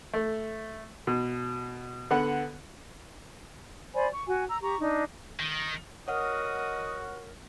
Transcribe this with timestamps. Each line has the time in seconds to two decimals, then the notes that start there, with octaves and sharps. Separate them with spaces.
0.14 A3
1.07 B2
2.11 D3 B3 F#5
3.94 C5 D5 G#5 B5
4.12 C#6
4.27 F#4 G#5
4.47 A#5 E6
4.62 G4 A#5 C#6
4.79 D4 D#4
5.40 D#3
6.08 F#4 A#4 C#5 D#5 F#5 D#6 F6